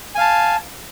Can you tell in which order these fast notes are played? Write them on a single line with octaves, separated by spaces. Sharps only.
G#5 F5 A5